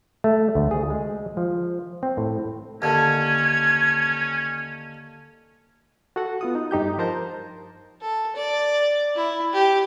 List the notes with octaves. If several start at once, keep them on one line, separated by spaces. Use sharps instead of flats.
A3
D2
G#4
G#3
F3
C4
A2
D#2 D3 C#4 G#6
F#4 A4 F#5
B3 F4 D#6
D#4
G2 D#4 G4 G6
F3 A#4 C5 A5 A#5 G6
A4
D5
E4
G4